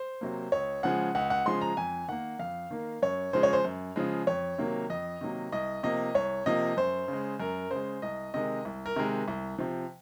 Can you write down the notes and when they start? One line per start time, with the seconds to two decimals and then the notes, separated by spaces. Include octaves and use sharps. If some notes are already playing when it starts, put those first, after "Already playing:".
Already playing: C5
0.21 C3 F#3 A#3
0.52 C#2 C#5
0.83 C#3 F3 G#3 F#5
1.15 C#2 F#5
1.30 F#5
1.46 C#3 F3 G#3 C6
1.61 A#5
1.77 F2 G#5
2.08 D#3 A#3 F#5
2.39 F2 F5
2.71 D#3 A#3
3.02 F#2 C#5
3.33 C#3 F3 G#3 C5
3.43 C#5
3.53 C5
3.65 F#2
3.96 C#3 F3 G#3
4.27 F2 C#5
4.58 C3 D#3 F#3 A#3
4.90 F2 D#5
5.21 C3 D#3 F#3 A#3
5.52 C2 D#5
5.83 C3 F3 A#3 D#5
6.15 C2 C#5
6.46 C3 F3 A#3 D#5
6.77 F#2 C5
7.08 C#3
7.13 G#3
7.40 F#2 A#4
7.71 C#3 G#3 C5
8.02 C2 D#5
8.34 C3 D#3 G#3 D#5
8.65 C2
8.86 A#4
8.96 C3 D#3 G#3
9.28 C2
9.58 C3 F3